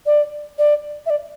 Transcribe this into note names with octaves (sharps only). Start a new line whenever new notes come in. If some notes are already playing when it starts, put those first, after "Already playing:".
D5
D5
E5
D5